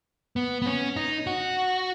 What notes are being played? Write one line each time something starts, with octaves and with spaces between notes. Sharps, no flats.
B3
B3
C#4
D#4
F#4